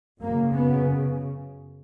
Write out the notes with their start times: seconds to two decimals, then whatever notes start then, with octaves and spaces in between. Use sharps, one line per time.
0.21 F#2 C#3 A#3
0.53 B3